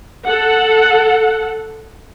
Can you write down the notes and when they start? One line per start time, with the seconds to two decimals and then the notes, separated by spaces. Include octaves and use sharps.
0.25 A4 F#5